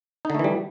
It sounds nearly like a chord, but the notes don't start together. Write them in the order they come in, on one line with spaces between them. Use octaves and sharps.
D#4 D3 A3 E3 G3